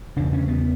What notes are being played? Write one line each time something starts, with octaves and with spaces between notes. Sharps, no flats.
E2 C#3 D4
C#4
B3